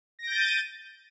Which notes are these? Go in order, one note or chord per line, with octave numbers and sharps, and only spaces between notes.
G6 A6 A#6 D7 D#7